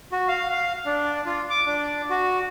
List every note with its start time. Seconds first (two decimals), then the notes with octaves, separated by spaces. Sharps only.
0.12 F#4
0.28 F5
0.50 F5
0.86 D4
1.26 F4
1.50 D6
1.66 D4
2.10 F#4